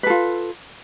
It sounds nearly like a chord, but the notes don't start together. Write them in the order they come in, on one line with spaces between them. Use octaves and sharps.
B4 A4 F4